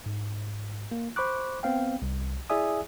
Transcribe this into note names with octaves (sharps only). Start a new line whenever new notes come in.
G#2
A#3
C5 B5 C#6 D6 F#6
B3 C4 F5 G5
C2
E4 G#4 D5 E5 G#5 D#6